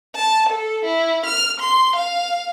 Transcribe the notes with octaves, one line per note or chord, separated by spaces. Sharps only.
A5
A4
E4
F6
C6
F5